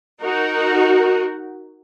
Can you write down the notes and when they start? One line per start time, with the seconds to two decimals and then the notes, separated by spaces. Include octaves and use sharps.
0.21 D#4 F#4 A#4